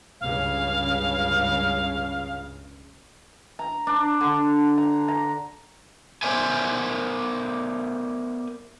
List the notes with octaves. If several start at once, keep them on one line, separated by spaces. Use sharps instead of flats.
C#2 G2 C#3 F5
A#5
D4
D3
A#5
A#5
B3 A#4 C5 D5 E5 G#5